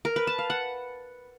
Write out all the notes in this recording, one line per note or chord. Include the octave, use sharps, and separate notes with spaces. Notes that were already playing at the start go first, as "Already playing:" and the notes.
A#4
B4
A5
F5
F#5